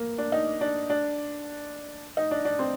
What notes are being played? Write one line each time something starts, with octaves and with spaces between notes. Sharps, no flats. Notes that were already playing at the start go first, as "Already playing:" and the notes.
Already playing: A#3
D4
D#4
D4
D4
D#4
D4
D4
C4